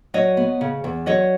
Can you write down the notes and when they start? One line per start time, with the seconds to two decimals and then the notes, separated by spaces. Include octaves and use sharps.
0.14 F#3 C#5 D#5
0.37 B3
0.61 C#3
0.84 E2
1.06 F#3 C#5 D#5